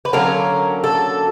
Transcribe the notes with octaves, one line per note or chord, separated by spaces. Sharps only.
B4
D3 F#3 A#3 C#4 A#4
A4